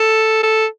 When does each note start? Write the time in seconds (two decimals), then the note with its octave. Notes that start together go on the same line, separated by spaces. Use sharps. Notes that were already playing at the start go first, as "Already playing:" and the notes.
Already playing: A4
0.43 A4